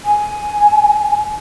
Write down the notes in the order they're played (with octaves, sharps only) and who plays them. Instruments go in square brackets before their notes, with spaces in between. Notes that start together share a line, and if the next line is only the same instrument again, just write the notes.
[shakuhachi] G#5